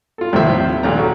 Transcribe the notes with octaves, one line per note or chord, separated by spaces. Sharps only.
F4 A4
D#2 A2 C3 F3 C5 E5
A#1 D#2 A3 A#5
F#4